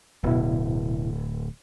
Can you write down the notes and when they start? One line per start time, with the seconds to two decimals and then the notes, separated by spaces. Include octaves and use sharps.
0.23 D1 F#2 B2 E4